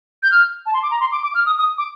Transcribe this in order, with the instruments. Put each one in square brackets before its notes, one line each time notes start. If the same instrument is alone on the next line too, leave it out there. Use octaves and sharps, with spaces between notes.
[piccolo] G6
F6
A5
C6
D6
A#5
C6
D6
D6
F6
D#6
D#6
D6